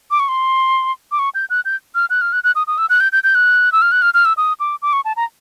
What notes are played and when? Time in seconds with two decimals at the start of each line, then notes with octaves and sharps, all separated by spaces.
0.11 D6
0.20 C#6
0.29 C6
1.12 D6
1.19 C#6
1.35 G6
1.50 F#6
1.65 G6
1.95 F6
2.10 F#6
2.21 F6
2.33 F#6
2.44 F#6
2.55 D#6
2.67 D#6
2.78 E6
2.90 F#6
3.00 G6
3.12 G6
3.24 G6
3.35 F#6
3.72 E6
3.82 F6
3.92 F#6
4.02 F6
4.14 F6
4.25 E6
4.37 D#6
4.60 D6
4.82 D6
4.93 C#6
5.05 A5
5.17 A#5